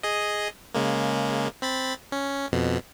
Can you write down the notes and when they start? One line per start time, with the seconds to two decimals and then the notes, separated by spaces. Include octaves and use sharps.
0.03 G#4 D#5
0.75 C#3 G#3 A#3
1.62 C4 B5 A6
2.12 C#4
2.52 F2 B2